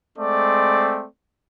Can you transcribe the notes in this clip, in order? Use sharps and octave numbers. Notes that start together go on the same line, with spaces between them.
G#3 A3 C4 D5